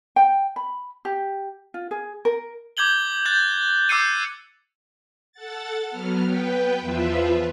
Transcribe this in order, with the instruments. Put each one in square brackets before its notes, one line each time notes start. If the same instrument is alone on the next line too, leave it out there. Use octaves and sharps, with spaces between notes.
[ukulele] G5
B5
G4
F4
G#4
A#4
[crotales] D6 G6 G#6 F#7 G7
F#6 G6 A6
D6 E6 G6 C7 C#7 D#7
[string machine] A4 F#5 A6
F#3 B3 F6
B3 B4 G5
E2 F3 F4 B4 E5